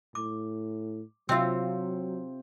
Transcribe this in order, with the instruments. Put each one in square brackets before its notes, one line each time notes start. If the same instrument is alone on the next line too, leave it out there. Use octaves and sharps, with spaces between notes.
[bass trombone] A2 [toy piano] D6
[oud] C3 F4 [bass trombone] F#3 [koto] C4 [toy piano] D4 E5 E6